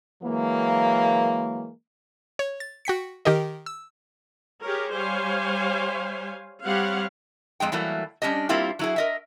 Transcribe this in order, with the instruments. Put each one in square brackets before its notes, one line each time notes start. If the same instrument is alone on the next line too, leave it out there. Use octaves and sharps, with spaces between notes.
[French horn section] E3 F#3 G#3 A#3
[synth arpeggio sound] C#5
A6
F#4 G5 B6 C#7
D#3 G4 A#4 D#5
E6
[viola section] G4 G#4 A#4 C#5
G3 C5 C#5 F5 G#5
G3 C4 G4 C#5 F5 F#5
[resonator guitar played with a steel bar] F2 G#3 G#4 G5
E3 F#3 G3 A3 A#3
G3 C#4 D4 G4 D#5
G3 A#3 C4 E4 F4 G4
F#3 E4 G#4
A#4 D#5 E5